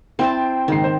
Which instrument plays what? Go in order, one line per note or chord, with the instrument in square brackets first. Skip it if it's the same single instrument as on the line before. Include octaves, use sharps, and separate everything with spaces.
[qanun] C4 C5 A5 [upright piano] E4 G5 C6
[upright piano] F#1 G#2 C7 [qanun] D#3
[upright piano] C5